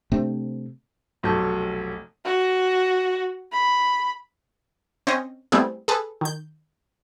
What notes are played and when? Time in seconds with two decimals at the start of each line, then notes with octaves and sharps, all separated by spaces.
0.12 C3 A3 C4 D4
1.23 F1 B1 F#3 A4 A5 G6
2.25 F#4
3.52 B5
5.07 C4 C#4 D#5
5.52 G3 A3 B3 C4 E4 G#4
5.88 G#4 A4 B4
6.21 D#3 G6